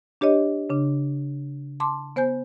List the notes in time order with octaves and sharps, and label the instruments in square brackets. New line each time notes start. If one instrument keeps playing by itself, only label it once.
[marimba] D4 G4 C#5 D#5
C#3 D4
A5 C6 D6
B3 C5 G#5 G6